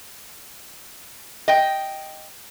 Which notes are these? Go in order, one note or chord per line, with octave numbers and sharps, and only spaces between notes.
D#5 G5